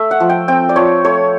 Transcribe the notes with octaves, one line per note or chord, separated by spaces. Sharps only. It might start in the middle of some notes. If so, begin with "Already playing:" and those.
Already playing: A3 E5
F#5
F3
G5
C4 G5
D5
F3 C#5
A3 C#5